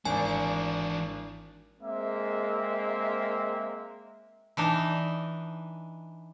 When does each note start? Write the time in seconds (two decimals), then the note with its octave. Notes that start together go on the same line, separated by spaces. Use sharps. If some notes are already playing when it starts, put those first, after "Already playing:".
0.05 G#1 E3 C4 D4 G#5
1.81 G#3 A#3 C4 E5
4.57 E3 D4 D#4